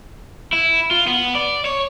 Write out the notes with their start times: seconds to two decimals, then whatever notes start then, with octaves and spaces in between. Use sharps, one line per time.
0.53 E4
0.91 F4
1.07 B3
1.35 D5
1.65 C#5